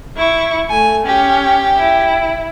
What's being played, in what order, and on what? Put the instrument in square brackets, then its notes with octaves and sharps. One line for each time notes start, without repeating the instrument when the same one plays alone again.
[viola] E4 C#6
[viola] A3 [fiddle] G#5
[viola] C#4 [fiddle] G4
[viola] E4